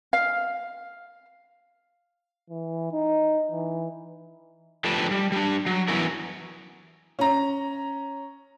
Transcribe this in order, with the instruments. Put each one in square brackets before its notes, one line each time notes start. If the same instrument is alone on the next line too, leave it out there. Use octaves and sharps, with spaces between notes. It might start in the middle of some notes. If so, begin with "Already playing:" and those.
[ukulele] F5
[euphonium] E3
D#4
E3
[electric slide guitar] D3 F3 A3 G4 B4 A5
G3
G3 D4
F#3
E3 F#3 B3 C#4 E4 A#4
[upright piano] C#4 A#5